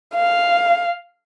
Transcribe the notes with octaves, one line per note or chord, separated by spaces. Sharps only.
F5